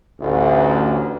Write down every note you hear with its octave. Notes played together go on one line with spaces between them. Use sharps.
A1 D2